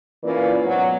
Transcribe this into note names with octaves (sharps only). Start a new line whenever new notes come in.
E3 A#3 C#4 F4 D5
G#2 B2 F#3